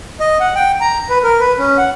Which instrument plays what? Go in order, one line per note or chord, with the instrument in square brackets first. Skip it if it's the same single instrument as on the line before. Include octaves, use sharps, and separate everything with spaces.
[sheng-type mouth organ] D#5
F#5
G5
A#5
B4
A#4
B4
C#4
F#5